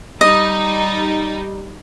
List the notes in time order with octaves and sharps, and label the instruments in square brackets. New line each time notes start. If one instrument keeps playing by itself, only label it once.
[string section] G3 D#4 [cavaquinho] D#5